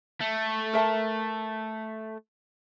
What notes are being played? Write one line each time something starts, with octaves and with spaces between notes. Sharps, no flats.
A3
A#4 E5 A5